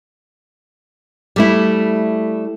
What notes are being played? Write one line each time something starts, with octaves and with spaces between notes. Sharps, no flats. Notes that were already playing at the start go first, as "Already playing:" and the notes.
G3 A3 E4